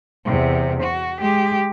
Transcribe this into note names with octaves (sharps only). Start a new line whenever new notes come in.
E2 C3
F#4
G#3 G4